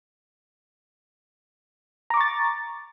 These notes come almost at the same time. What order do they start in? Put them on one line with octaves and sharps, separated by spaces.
A#5 D6 C#6 A6